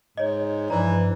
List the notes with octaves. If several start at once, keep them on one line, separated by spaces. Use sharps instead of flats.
G#2 C#5 D#5
G2 E3 F3 D5 A#5